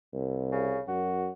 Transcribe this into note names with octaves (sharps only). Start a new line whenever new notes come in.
C2
C#3
F#2 F#4